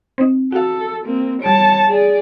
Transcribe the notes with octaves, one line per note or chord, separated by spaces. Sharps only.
C4 D#4
F#4 A4 F5
A#3 C4
G3 C#5 A5 D7
G#4 D5